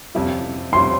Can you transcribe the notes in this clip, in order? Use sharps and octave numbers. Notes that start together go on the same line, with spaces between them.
F2 C3 G3 C#4 E4
F2 C3 G3 C#4 E4 C6